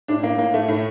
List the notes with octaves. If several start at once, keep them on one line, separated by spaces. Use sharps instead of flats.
A2 D4
A2 A#3
A2 A#3
A2 A3
A2